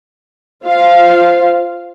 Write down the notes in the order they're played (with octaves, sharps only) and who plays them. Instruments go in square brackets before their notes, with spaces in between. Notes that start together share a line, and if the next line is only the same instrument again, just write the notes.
[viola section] F4 F5 [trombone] C5